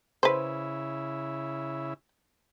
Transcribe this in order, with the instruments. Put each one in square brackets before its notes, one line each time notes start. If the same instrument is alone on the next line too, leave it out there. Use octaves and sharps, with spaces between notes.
[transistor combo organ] C#3 E4 [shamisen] B4 C5